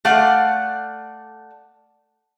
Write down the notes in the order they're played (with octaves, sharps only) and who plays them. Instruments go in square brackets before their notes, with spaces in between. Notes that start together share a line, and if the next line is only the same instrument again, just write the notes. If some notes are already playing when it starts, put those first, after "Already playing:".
[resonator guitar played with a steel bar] A3 D5 F5 F#5